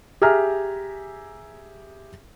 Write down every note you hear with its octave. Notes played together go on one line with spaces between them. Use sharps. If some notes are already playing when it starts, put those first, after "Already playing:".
G4 G#4 E5 G#5 A#5 F6